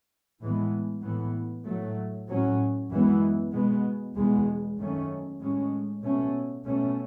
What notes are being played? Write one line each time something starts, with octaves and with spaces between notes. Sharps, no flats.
A2 E3 G#3 B3
A2 E3 B3
A2 F#3 A3
A2 F#3 C#4
F#2 E3 G#3 B3
B2 G#3 B3
E2 B2 G#3 B3
F#2 D#3 A3 C#4
A2 G#3 C#4
B2 A3 C#4
B2 A3 C#4